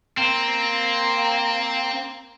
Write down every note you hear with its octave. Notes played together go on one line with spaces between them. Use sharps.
A#3 C4